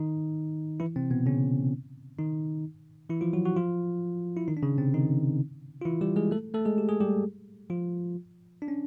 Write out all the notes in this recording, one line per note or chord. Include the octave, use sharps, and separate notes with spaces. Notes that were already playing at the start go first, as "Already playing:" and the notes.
Already playing: D#3 D#4
E3 E4
C3 C4
B2 B3
C#3 C#4
D#3 D#4
E3 E4
F3 F4
F#3 F#4
F#4
F3 F4
E4
D#3 D#4
D4
C#3 C#4
C3 C4
D#3 D#4
F4
E3 E4
G3 G4
G#3 G#4
A3 A4
A3 A4
G#3 G#4
G4
G#4
G3 G4
F3 F4
D4
C#4